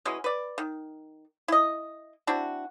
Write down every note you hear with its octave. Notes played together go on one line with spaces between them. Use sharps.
E3 F#3 G#3 C#4
B4 D5
D#3
E4 D#5
C4 D4 E4 F#4